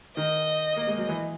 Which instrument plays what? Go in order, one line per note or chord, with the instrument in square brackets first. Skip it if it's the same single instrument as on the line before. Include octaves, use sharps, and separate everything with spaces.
[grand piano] D#3 [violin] D#5
[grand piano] A#3
G#3
F#3
E3